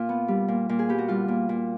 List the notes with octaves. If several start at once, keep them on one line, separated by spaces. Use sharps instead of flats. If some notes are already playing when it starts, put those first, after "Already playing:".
Already playing: A#2 F4
B3
G3
A#2
A#2
G#4
B3 G4
F#4
G3 F4
A#2
A#2